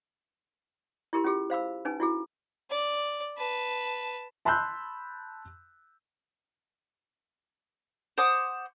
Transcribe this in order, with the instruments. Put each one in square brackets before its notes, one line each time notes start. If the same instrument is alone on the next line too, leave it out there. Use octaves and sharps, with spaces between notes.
[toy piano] E4 G4 A#4 C6
C#4 F4 G4 G#4
C5 F5 B5 E6
C#4 D#4 B4 G#5
E4 F#4 G#4
[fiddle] D5
B4 A5
[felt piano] A5 B5 C6 E6 F#6 G6
[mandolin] C5 F#5 D6 D#6